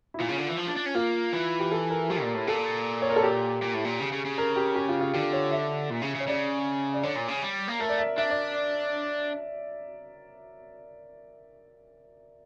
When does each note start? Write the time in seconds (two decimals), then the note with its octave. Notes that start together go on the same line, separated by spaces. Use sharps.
0.14 E4
0.20 A#2 F4
0.28 C#3
0.38 D3
0.48 E3
0.57 F3
0.66 D4
0.77 D4
0.86 C#4
0.95 A#3 F4
1.33 E3
1.60 G4
1.72 A4
1.90 A#4
2.10 F3 G4
2.22 A#2
2.34 A2
2.47 A#2 A4
3.02 C#5
3.09 A#4
3.16 A4
3.23 G4
3.62 A#2
3.74 A2
3.85 A#2
4.00 C#3
4.12 C#3
4.25 C#3
4.38 A#4
4.56 G4
4.76 G4
4.89 F4
5.01 F4
5.14 D3 G4
5.33 C#5
5.51 E5
5.90 A#2
6.02 C#3
6.15 C#3
6.20 C#5
6.27 C#3 D5
6.94 D5
7.03 D3 C#5
7.16 A#2
7.28 C#3
7.42 G3
7.68 A#3
7.80 A3 A#4
7.89 D5
7.98 E5
8.18 D4 E5
8.30 D5